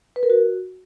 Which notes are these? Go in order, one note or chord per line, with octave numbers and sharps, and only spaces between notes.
B4
A#4
F#4